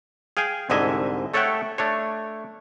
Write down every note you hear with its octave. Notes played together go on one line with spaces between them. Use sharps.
G#4 F5 G5 G#5
C2 G#2 D3 D#5 E5 G#5
A3 A4 C#5 E5 F#5 G5
A3 D4 C#5